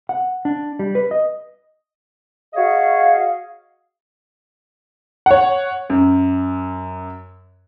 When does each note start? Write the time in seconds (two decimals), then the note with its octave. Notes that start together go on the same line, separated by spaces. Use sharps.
0.09 F#5
0.45 D4
0.79 G3
0.95 B4
1.11 D#5
2.54 F#4 G#4 C#5 D#5 F5
5.26 C#5 F#5
5.90 F#2